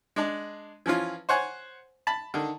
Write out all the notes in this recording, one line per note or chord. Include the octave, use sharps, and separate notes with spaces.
G#3 D4
E3 F3 C#4 F4
C5 C#5 F#5 G#5
A5 B5
D3 D#3